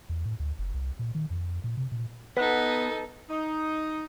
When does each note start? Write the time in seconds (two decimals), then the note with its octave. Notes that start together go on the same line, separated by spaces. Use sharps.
0.09 E2
0.25 A2
0.40 D2
0.59 F#1
0.74 C2
0.99 A#2
1.15 D#3
1.30 F2
1.64 A#2
1.77 C3
1.92 A#2
2.37 B3 D#4 A4 B4 F#5 F#6
3.30 D#4